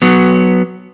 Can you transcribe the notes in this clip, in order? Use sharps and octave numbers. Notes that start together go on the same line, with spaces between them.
F#3 B3